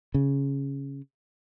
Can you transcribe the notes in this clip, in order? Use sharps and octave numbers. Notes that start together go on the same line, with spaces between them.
C#3